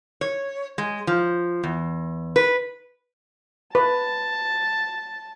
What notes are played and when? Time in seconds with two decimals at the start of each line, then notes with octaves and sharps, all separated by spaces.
0.21 C#5
0.78 G#3
1.07 F3
1.63 E2
2.36 B4
3.75 B4 A5